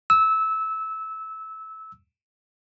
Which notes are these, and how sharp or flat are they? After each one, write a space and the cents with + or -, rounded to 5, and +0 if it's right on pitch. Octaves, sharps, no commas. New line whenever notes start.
E6 -20